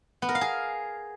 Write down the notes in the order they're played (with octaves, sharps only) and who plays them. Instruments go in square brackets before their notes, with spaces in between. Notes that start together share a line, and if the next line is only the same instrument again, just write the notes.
[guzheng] B3
A#4
F5
G#4